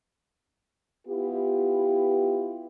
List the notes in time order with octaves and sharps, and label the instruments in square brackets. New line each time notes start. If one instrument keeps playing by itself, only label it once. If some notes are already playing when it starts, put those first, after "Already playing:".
[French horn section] B3 E4 F4 G4